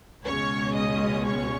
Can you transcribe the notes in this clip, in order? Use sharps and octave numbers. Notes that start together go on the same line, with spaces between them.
C#2 B2 G#3 C#4 C#5 C#6
D#5 D#6
C#5 C#6